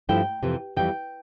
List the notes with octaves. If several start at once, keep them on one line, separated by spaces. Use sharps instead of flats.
G2 F3 A3 E4 G5
F2 C3 E3
F2 E3 G3 G5